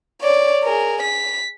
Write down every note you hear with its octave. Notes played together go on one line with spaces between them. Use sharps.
C#5 D5
G#4 A#4
B6